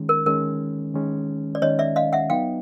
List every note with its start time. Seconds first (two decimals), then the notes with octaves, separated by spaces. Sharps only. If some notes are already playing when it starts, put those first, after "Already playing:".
Already playing: D#3 G#3 C#4
0.09 A#4
0.26 D#3 G#3 C#4 A#4
0.94 D#3 G#3 C#4
1.55 D5
1.62 D#3 G#3 C#4 C#5 D#5
1.79 D5 E5
1.96 D#5 F5
2.13 E5 F#5
2.30 F#3 B3 D#4 F5 G5